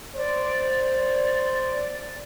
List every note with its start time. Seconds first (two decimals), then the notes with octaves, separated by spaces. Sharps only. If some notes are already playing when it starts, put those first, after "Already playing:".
0.15 C5 D5